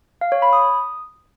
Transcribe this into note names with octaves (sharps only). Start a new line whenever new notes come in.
F5
C#5
B5
D#6